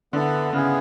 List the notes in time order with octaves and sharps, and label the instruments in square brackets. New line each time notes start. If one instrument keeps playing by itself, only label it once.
[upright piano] D3 [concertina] B3 E4 A4
[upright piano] C#3 [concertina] B3 E4 G#4